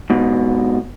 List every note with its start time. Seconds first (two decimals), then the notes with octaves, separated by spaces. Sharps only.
0.10 G#2 B2